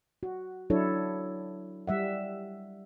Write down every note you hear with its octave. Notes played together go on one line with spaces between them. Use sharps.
F#4
F#3 D4 E4 A4 C#5
G3 E5 F#5